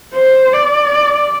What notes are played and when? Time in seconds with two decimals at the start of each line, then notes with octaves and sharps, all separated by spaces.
0.15 C5
0.53 D5